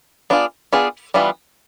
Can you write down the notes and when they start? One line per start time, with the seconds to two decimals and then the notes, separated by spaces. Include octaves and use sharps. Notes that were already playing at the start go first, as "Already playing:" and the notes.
0.30 B3 D4 F4 G#4
0.72 B3 D4 F4 G#4
1.14 E3 G3 B3 D4 F4